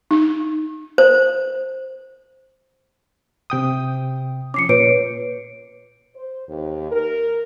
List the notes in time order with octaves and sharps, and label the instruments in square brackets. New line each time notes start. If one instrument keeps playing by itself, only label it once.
[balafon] D#4
[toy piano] C5
[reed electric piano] C3 G5 D#6
[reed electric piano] F3 C#4 [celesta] D6 C7 C#7
[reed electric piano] A#2 [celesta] B4 C#5 D7
[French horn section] C5
D#2
A#4